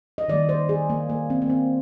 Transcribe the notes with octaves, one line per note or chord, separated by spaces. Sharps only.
D#5
D#3 G3 A#3 D5
C5
G#4
A#3
A#3
C4
A#3
C4